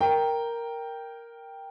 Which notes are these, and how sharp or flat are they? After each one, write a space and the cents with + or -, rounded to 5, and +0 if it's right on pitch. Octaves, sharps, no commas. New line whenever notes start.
A#4 +0 G5 +0